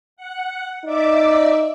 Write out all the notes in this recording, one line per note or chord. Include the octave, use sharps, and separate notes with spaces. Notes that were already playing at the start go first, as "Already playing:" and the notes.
F#5
D#4 D5 E5 D6